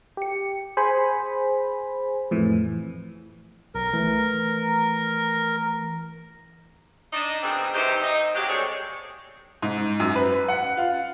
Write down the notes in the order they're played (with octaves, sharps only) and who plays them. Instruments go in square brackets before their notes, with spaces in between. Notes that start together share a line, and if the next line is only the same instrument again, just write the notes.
[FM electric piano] G4 C#7
G#4 C5 G#5 B5
F2 A2 E3
[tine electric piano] B1 [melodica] A#4
[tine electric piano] E3 A3
[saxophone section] D4 D#4 D5 D#5
B2 D#3 G3 C4 D4 G#4
C3 D#3 E3 G4 C5
D#4 D#5
C#3 F#3 G#3 G4
G#3 A3 C4 G#4 C#5 D5
[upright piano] G#2
F#2
B4
F#5
F4